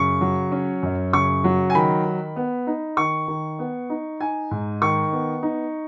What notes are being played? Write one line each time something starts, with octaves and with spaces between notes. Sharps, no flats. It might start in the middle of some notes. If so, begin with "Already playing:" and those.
Already playing: F#2 C#3 C#6
F#3
C#4
F#2
C#3 C#6
F#3
G#5
D#3 B5
D#3
B3
D#4
D#3 C#6
D#3
B3
D#4
D#4 G#5
G#2
D#3 C#6
B3
D#4